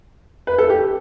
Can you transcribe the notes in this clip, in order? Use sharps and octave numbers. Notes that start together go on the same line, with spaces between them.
B4
A4
G4